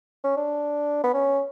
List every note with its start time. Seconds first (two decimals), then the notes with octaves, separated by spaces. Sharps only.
0.24 C#4
0.37 D4
1.04 B3
1.14 C#4